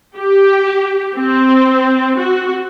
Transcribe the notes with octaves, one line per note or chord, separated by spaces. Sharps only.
G4
C4
F#4